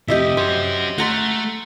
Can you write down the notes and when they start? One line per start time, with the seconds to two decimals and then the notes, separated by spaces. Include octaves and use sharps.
0.08 F2 C3 G4 D#5 E5
0.37 C#4 F#4 C5
0.98 A3 F#5 A#5 C6